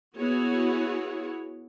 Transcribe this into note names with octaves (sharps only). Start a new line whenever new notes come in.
B3 E4 F#4 G#4 C#5